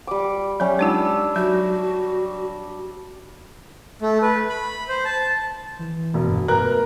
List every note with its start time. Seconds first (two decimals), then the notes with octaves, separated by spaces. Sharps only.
0.07 G3 D6
0.60 F#3 G3 C#4
0.79 G#3 D4 D#4 F4 E6
1.36 F#3 F#4
4.02 A3
4.22 B4
4.49 B5
4.89 C5
5.05 A5
5.79 E3
6.14 E1
6.26 G2
6.48 A#4 B4 A#5 F#6